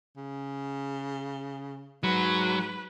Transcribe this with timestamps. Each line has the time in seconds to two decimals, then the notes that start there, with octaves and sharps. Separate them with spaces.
0.17 C#3
2.03 G#2 F#3 B4